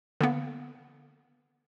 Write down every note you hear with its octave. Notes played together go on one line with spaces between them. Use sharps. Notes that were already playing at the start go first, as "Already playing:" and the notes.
D3 A#3 B3